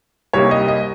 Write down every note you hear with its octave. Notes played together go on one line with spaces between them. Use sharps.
C2 C3 G3 A#3 D#4 C#5
D#5
D#5